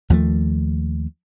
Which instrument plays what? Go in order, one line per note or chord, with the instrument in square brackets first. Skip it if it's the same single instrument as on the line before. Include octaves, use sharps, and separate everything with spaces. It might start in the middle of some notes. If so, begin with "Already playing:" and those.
[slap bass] D#2 F3 F#3 A3